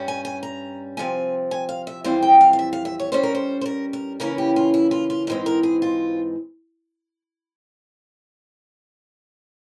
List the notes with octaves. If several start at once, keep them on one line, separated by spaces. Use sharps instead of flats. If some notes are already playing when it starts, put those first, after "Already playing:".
Already playing: G2 G3 C#4
G#5
G#5
A#5
C3 F3 C4 G#5
G#5
F5
E5
F2 E3 G3 C4 F5
G5
F5
F5
E5
F5
E5
C#5
G2 G3 C#4 C5
A#4
C5
C5
A#4
A#4
C#3 E3 A#3 C#4 A#4
G4
F4
E4
F4
F4
G#2 E3 G#3 C4 A#4
A#4
G#4
F4